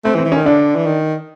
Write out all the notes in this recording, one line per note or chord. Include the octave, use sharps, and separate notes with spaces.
A3 C4
E3
C4
E3
C#4
D#3
D3 D4
E3
D#3